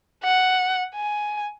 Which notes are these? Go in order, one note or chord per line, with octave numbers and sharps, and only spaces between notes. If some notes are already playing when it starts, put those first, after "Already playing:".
F#5
G#5